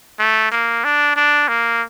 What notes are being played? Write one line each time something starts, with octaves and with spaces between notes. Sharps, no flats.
A3
A#3
D4
D4
A#3